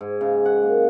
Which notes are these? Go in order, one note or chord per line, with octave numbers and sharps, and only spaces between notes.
G#2
C#3
F#5
A#3